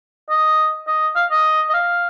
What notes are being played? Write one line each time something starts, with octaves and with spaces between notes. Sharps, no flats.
D#5
D#5
F5
D#5
D#5
F5